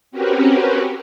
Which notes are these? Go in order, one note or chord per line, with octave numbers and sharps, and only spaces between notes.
C4 C#4 F#4 G4 A#4 B4